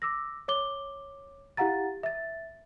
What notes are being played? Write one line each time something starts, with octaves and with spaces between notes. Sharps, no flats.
D6 E6 A#6
C#5 D6 G7
E4 G4 F5 F#5 A#5 A6
E5 A6